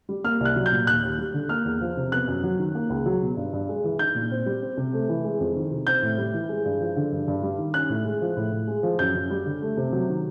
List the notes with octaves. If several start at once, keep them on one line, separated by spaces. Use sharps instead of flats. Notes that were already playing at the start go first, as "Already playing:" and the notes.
G3
A#3 F6
C2
F#6
F#3
G6
A#2
D#2 F#6
D#2
G3
D3
A#3 F6
E2
F3
C3
B3 F#6
F#2
F#3
D#3
A#3
C#2
F#3
B2
G2
G2
G#3
E3
D#4 G6
A#2
C4
G3
C4
C3
A3
E3
G#3
F2
D#3
C3
C4 G6
A2
G3
E3
G#3
G2
F3
D3
G2
G2
G3
D#3
C#4 F#6
A2
G#3
F3
A2
A2
G#3
F3
F#2 G6
F#2
G3
D3
A3
C3
F#3
D#3